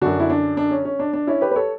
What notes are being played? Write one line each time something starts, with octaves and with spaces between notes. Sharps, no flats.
F#2 D3 D4 F#4
E4
D4
D4
C#4
C#4
D4
D4
C#4 E4
G4 B4
B4
A4 C#5